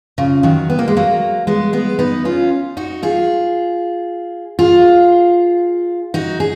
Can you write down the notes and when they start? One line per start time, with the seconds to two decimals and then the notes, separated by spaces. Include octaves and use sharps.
0.18 C#3 F3
0.43 D#3 F#3
0.70 B3
0.79 A#3
0.88 G#3
0.97 F#3 A#3
1.47 G#3 B3
1.73 G#3 B3
1.99 B3 D#4
2.25 C#4 F4
2.77 D#4 F#4
3.03 F4 G#4
4.59 F4 G#4
6.14 D#4 F#4
6.40 G#4